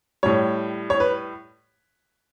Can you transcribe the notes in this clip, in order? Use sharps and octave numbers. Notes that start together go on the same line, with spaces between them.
A2 G3 C#5
C#5
B4